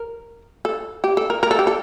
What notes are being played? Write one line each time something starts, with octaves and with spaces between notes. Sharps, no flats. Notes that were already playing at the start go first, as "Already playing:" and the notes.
Already playing: A#4
A4
G4
A4
A#4
A#4
A4
G4
A4